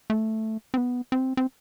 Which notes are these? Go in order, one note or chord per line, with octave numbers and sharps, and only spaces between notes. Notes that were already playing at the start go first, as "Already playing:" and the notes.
A3
C4
B3
C4
C4